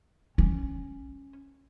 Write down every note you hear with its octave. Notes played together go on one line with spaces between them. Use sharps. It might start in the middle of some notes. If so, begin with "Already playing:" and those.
C#4